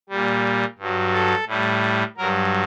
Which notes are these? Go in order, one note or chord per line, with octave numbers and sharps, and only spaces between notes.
A#2 G3
G2 F#3
A4
A2 G3
G2 F#3 A#4